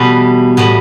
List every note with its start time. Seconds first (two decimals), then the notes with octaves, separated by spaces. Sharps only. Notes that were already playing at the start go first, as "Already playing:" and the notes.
Already playing: B2 E3 G3 A3 B3
0.57 A2 G3 B3